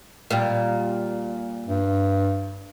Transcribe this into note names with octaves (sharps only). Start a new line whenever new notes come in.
A#2 G3
G2